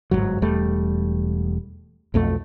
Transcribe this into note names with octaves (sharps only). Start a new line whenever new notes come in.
G1 C2 G#2 F#3
E1 E2 G3 A3
B1 F2 A3